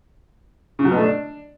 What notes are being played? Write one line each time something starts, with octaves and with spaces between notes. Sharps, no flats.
C#3
F#3
B2
A3
D4